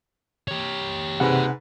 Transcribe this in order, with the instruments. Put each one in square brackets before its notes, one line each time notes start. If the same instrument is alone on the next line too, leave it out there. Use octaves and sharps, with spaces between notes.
[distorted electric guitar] G4 C#5
[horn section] G#2 B4 [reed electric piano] C3 F#5